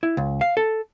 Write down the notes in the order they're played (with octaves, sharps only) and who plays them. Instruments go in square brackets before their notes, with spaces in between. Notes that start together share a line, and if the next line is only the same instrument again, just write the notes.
[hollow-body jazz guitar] E4
C#2
F5
A4